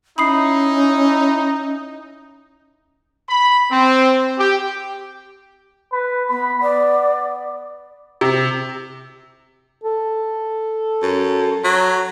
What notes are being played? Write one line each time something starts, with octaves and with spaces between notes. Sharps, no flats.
C#4 D#4 E4 B5 D#6 C7
B5
C4
G4
B4
B3 B5
B3 D5
C3
A4
F#2
F#3